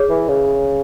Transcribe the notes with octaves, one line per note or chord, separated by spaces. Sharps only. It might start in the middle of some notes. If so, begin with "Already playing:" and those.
Already playing: G#4 C#5
E3
C#3